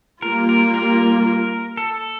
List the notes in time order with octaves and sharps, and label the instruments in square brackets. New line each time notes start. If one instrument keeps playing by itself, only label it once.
[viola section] G3 A#3 F4 [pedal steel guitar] A#4
[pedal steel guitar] A#4
A#4
A4